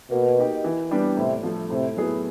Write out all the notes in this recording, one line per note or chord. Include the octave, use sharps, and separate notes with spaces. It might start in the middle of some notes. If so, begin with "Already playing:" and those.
B2 A#3
D#4 G4
E3
G3 B3 D4 G4
A2 C3
F3 A3
A2 C3
F#3 B3 E4 G#4